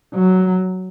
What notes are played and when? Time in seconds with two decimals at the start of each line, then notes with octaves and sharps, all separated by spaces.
0.15 F#3